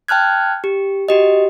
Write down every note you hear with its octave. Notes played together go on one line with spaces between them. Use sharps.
G5 A5 F6 F#6 G#6
G4
F#4 G4 D#5